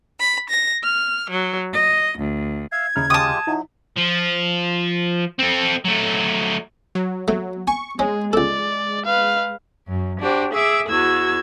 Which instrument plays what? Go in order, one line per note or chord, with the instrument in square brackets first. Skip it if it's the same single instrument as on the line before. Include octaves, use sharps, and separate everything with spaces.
[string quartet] B5
A#6
F6
F#3
D#5
D2
[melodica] E5 F5 [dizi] G#6
[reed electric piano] D#2 C#3 F6 [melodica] D#4 E4
[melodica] G#3 F4 G4 [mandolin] A5 D#6
[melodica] F#3 [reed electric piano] D#4 E4
[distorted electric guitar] F3
C4 A4
F#3 A3
[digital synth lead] F#3
[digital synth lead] F#3 [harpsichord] A3
[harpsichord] G#5 [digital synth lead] C#6
[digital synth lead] G#3 [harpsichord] C#4 [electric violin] G#4
[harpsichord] C#2 A4 [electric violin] D5
[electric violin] B4 F5
[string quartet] F#2
D4 F#4 G4 C5
G#4 E5 D6 E6
E2 F#4 E6 G#6